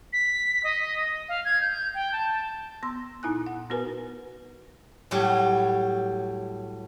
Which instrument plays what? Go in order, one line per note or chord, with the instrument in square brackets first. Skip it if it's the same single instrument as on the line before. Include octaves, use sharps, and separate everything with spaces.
[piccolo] B6
D#5
F5
G#6
G6
G5
A5
[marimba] B3 C6 E6
A#2 D#4 E4 G#5 F#6
F#5
B3 F#4 A#4 B4 G#5
[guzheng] A2 F#3 G3 F#4 G4